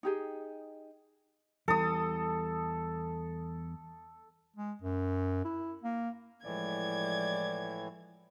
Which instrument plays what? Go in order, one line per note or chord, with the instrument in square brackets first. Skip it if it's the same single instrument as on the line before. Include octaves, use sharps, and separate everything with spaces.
[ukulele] D#4 G4 G#4
[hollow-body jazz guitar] E2 E3 G3 [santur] A4 D#6
[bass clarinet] G#3
F#2
E4
A#3
[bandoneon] A2 E3 [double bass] F3 G#3 [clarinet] D5 [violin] G#6